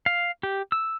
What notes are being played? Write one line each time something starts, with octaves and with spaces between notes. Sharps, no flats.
F5
G4
E6